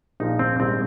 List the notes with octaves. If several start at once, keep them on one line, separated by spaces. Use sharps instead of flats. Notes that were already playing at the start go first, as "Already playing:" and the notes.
A#1 A#2 F3 D#4
C4
A#1 G#2 G3 C4